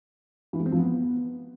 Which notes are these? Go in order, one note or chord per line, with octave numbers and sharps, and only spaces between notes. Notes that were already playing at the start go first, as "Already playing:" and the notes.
E3
G#3
C4
F3
B3